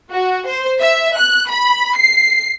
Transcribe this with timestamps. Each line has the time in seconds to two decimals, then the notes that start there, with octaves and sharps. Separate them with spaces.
0.11 F#4
0.47 C5
0.81 E5
1.17 F#6
1.49 B5
1.96 C7